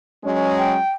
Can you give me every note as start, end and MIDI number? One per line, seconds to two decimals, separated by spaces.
0.24 0.77 54
0.24 0.77 56
0.24 0.77 61
0.58 0.90 79